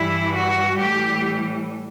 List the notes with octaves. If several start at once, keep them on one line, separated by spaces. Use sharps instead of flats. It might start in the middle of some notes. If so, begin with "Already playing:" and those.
Already playing: G2 E3 G3 E4
F#4
A2 E3 G3 G4